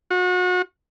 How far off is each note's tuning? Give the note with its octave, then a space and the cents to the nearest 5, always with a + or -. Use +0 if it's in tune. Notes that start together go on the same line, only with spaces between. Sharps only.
F#4 -35